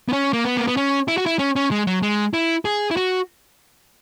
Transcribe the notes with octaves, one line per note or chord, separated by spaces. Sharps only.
B3
C#4
A#3
B3
A#3
B3
C#4
E4
F#4
E4
C#4
C#4
G#3
F#3
G#3
E4
G#4
E4
F#4